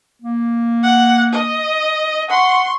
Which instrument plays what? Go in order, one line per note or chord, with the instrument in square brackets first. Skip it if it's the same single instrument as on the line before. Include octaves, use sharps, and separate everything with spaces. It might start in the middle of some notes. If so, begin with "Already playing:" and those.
[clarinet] A#3
[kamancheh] F#5
D#5
[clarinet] F#5 [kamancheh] C6 C#6